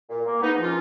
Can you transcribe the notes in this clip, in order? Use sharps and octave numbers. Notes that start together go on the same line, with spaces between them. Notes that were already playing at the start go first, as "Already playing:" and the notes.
A#2
A#3
G#2 B3 D#4
F3
C#4 F4